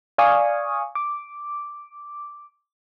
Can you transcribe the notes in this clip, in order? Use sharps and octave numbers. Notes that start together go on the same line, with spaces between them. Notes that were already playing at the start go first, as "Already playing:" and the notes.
D5 F5 G#5 C#6 D#6
D6